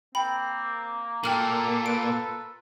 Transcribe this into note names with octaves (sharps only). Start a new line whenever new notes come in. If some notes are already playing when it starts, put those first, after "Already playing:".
A#3 C4 G5 B5
A#2 A4 G5 F6 F#7
F4 A#4 B4 D7